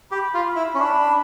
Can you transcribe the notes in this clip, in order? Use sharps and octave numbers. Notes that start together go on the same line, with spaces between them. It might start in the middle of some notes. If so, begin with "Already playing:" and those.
G4 B5
F4
E4
C#4
D4